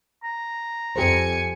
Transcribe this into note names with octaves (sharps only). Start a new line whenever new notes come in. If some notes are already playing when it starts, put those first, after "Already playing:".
A#5
F2 G4 A4 C5 G#5 C#7